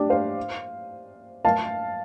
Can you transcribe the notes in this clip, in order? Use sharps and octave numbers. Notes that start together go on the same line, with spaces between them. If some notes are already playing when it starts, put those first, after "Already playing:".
Already playing: D4 G4
C5 F5
F5 A5